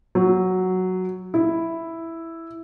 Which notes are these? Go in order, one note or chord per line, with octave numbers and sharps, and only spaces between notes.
F#3
E4